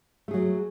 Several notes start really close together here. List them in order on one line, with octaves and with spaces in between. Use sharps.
A3 G#4 F#3